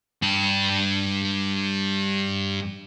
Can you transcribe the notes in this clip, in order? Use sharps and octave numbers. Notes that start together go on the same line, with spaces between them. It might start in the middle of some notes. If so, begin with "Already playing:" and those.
G2 A5